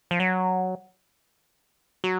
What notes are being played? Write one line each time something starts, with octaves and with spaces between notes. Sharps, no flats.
F3
F#3
F#3